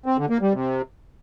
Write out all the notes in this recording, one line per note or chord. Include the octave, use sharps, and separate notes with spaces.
C4
D3
A#3
G3
C3